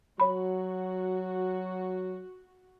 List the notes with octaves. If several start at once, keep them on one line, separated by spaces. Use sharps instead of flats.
F#3 F#4 C#5 B5